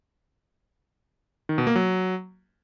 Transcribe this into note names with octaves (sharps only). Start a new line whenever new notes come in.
D#3
B2
A#3
F#3